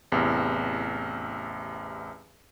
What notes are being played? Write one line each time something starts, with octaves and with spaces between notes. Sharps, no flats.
A1 E2 C3